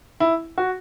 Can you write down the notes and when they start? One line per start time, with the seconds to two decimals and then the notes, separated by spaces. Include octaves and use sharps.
0.20 E4
0.58 F#4